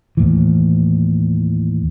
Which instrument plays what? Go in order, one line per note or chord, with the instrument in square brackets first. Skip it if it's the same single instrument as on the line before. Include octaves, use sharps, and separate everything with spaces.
[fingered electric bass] D#2 A2 E3